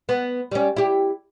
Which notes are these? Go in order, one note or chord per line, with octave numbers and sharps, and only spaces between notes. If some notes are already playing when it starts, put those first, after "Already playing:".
B3
G3 C#4
E4 G4